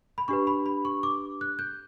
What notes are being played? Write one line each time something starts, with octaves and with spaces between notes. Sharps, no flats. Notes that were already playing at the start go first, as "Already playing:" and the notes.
B5
D4 G4 B4 C#6
B5
B5
C#6
D6
F#6
G6